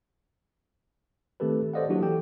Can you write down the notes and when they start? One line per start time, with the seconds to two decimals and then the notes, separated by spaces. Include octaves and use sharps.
1.40 D#3 A3 C4 G4 A4 B4
1.73 A4 C5 D5 D#5 F5 F#5
1.89 F#3 A#3 D4 E4 F#4 G4
2.02 E3 G4 A4 G5